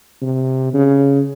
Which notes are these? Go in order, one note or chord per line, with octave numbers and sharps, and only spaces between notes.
C3
C#3